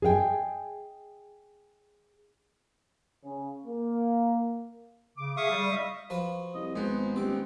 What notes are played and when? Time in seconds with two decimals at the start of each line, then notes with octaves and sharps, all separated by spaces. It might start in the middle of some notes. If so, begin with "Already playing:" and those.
0.02 G#4 D#5 F5 G5 G#5
3.23 C#3
3.66 A#3
5.17 C#3 D6
5.37 G#4 E5 F5 C#6 D#6
5.50 G3
5.71 D#5 E5
6.10 F3 F#4 B4
6.54 C2 D#5
6.75 G#1 G#3 B3 C5
7.16 D#1 C4 G4 D6